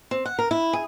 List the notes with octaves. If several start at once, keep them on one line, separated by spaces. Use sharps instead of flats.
C4
F#5
A#4
E4
G#4